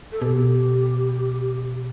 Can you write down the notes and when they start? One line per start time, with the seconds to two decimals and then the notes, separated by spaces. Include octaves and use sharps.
0.12 A4
0.22 B2 G4